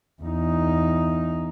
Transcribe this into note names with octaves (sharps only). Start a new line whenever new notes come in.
E2 D#4